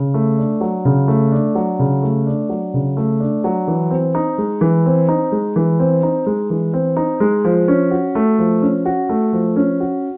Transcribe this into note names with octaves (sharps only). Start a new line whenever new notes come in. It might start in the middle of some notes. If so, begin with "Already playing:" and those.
Already playing: C#3
A3
D4
F#3
C#3
A3
D4
F#3
C#3
A3
D4
F#3
C#3
A3
D4
F#3
E3
C4
D#4
G#3
E3
C4
D#4
G#3
E3
C4
D#4
G#3
E3
C4
D#4
G#3
F3
C#4
F#4
A3
F3
C#4
F#4
A3
F3
C#4
F#4